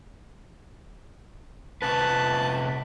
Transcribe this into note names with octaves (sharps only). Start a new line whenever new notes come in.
C3 C#4 B4 A5 F#6